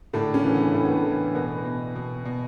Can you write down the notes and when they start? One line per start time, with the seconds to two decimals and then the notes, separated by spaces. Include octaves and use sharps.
0.13 A2 D3 D4
0.34 C#3 C#4
0.44 E3
0.54 B3
0.74 A2 A3
0.85 B3
0.96 A3
1.05 E3
1.35 B2 B3
1.65 B2
1.95 B2
2.25 B2